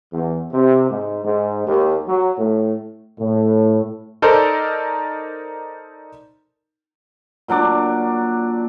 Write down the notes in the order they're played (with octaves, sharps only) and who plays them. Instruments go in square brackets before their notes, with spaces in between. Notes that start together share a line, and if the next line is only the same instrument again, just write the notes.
[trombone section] E2
C3
G#2
G#2
D#2
F#3
A2
[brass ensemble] A2
[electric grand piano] D#4 A4 A#4 C5 D5
[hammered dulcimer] A#2 F#3 D4 D6